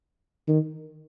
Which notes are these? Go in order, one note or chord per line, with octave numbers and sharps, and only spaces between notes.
D#3